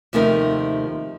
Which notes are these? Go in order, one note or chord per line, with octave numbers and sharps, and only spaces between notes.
D#2 C3 F3 A3 D#4 A#4